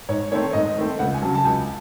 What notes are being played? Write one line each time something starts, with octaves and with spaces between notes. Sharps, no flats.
G#2 C#5
D#3 A3 C4 C#5
G#2 D#5
D#3 A3 C4
C#2 F#5
G#5
C#3 F#3 A5
A5
C#2 G#5